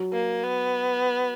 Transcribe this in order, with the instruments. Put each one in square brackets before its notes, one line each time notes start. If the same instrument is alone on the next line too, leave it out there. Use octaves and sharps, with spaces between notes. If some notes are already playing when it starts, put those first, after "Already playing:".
Already playing: [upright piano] F#3
[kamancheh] A#3
B3